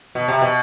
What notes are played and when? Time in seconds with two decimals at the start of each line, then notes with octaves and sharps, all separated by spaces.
0.15 B2
0.28 C3
0.41 B2